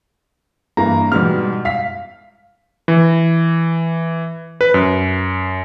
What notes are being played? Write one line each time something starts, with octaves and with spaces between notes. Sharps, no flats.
G2 E3 A#3 A#5
G#2 B2 G3 F6
F5 B6
E3
B4
F#2